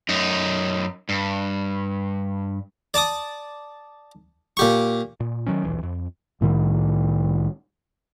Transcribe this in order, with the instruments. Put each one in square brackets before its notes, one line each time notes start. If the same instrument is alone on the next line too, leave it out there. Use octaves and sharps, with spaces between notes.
[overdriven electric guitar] F#2 D#4
G2
[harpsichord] D5 A5 D6 D#6
A#2 G4 C#6
[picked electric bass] A#2
D#3 F#3 C#4
D#1 B1 E3
F2
[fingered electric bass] C2 A2 D#3